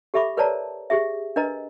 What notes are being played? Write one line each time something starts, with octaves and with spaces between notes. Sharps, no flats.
G4 A4 E5 B5 D6
A#4 B4 C#5 D5 A5 A#5
G4 G#4 E5
D4 A#4 B4 D#5 A#5